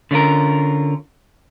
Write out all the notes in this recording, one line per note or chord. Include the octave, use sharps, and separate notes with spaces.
D3 C#4 F4 A#4